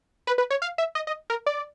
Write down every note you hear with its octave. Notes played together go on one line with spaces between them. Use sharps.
B4
B4
C#5
F5
E5
D#5
D#5
A#4
D5